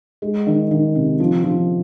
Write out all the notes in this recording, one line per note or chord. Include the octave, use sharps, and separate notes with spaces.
G#3
D#3
D#3
C3
F3
F3